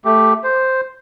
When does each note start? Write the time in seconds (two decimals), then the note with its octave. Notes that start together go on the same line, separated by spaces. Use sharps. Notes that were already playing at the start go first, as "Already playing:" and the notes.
0.05 A3 G4
0.44 C5